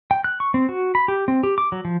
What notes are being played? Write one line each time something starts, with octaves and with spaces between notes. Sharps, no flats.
G5
F#6
C#6
C4
F#4
B5
G4
C4
G4
D6
F#3
F3